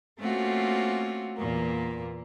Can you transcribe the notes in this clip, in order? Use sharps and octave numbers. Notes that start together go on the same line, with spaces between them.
A3 A#3 C4 C#4 F4 F#4
E2 A#2 A#3